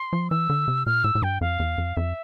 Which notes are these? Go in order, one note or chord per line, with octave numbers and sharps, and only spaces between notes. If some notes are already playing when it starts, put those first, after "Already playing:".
Already playing: C6
F3
E3 E6
D3
C3
A#2 F6
A2 E6
A2
G2 G5
F2 F5
E2
F2
F2 E5